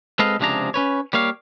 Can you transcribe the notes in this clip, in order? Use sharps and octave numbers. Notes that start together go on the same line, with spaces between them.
G#3 C4 A4 B4 D#5 F5
C#2 C3 F3 D4 G#4 A#5
C#4 B4 C#5
G3 A#3 C#5 F5